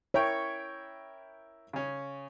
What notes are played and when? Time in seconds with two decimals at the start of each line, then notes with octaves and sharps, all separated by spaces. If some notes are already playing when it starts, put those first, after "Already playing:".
0.14 E4 A#4 C#5 G5
1.73 C#3 C#4